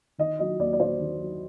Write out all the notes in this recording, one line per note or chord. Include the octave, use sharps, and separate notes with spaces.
D#3 D#5
F#3 D#5
D#2 D5
D5
D#2 C5
D#3
F#3